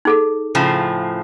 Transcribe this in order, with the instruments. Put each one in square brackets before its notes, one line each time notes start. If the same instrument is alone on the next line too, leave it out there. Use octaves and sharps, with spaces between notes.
[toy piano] D#4 G#4 A4
[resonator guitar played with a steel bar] A2 C#3 F3